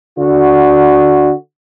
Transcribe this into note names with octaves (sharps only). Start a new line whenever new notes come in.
D3 F#4